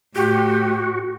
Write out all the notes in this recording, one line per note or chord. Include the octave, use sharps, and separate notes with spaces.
A2 A3 F#4 G4